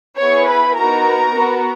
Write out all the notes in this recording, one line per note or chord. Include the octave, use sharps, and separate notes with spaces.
B3 E4 G#4 C#5 C#6
B4 B5
B3 D#4 F#4 A#4 A#5
B3 F#4